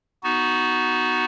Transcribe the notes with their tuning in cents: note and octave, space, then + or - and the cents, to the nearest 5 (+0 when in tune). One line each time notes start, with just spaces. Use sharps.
B3 +0 D#4 +0 F#4 +0